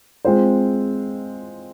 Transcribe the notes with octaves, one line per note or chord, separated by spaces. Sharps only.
G#3 C4 F4 C5